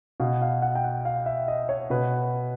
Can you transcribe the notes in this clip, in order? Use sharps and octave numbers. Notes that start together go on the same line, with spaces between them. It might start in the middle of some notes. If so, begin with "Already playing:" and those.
B2 F5
F5
F#5
G5
F#5
F5
E5
D#5
C#5
B2 B4